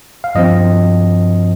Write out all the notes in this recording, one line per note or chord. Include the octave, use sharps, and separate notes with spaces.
F5
G2 F3 C4 D#5